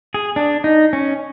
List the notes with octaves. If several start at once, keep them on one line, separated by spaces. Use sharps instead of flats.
G#4
D4
D#4
C#4